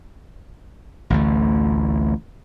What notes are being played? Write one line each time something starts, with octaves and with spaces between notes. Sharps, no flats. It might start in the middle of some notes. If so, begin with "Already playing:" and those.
A1 D2 A3